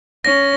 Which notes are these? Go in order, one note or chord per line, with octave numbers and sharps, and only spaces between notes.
C#4 A#6